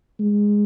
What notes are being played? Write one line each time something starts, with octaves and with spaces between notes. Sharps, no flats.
G#3